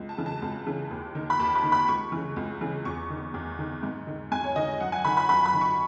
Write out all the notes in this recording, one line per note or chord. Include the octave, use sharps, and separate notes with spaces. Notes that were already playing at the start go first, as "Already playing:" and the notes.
Already playing: C#2
A5
C#3 E3
A5
C#2
C#3 E3
D#2
D#3
B5
D#2 A5
B5
D#3
B5
C#2 C#6
C#3 E3
C#2
C#3 E3
E2 C#6
D#3
E2
D#3
G#2
D#3
G#2 G#5
C#5
D#3 D#5
F#2 F#5
G#5
D#3 B5
B5
F#2 B5
B5
D#3
C#6